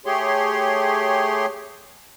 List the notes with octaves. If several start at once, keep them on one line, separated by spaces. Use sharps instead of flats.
A3 G4 G#4 C#5 C6